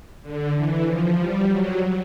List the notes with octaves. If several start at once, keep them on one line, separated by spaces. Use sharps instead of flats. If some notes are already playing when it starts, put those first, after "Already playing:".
D3
E3
F3
G3
F#3